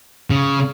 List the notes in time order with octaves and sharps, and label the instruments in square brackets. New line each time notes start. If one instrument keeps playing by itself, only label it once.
[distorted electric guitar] C#3